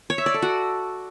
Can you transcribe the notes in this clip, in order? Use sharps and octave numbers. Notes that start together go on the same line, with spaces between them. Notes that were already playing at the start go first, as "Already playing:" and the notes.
C#5
E5
D5
A4
F#4